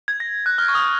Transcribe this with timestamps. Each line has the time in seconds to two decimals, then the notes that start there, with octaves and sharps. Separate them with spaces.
0.08 G#6
0.20 A#6
0.46 F#6
0.58 F6
0.68 C#6
0.75 D#6